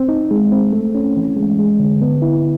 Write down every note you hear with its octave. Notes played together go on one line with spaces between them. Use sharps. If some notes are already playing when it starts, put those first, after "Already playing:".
Already playing: C4
D#4
G#3
C4
A3
C#4
E3
G#3
G#3
D3
B3
E4